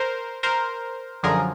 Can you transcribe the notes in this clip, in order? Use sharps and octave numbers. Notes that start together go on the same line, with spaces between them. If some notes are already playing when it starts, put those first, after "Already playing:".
Already playing: A#4 C5
A#4 C5
F#2 D3 F3 G#4 A#4